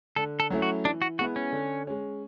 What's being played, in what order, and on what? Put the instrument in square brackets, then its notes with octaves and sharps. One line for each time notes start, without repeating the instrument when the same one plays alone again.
[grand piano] D3 [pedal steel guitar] A4
[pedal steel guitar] A4
[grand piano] F#3 A3 C#4 E4
[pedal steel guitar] F#4
[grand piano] E3 [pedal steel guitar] D4
[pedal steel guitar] F#4
[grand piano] G#3 B3 E4 [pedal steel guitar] F#4
[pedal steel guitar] C#4
[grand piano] D3
G#3 C#4